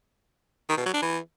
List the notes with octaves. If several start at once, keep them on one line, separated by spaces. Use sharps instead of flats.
D#3
B2
F#3
D4
E3